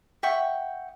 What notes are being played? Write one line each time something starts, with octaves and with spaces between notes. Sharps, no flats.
E5 F#5 G5 C#6